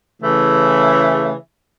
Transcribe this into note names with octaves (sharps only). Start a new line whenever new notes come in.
C#3 E3 A3